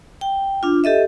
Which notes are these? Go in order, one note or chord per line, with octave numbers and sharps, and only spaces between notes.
G5
D4 F4
G4 A4 D#5 E5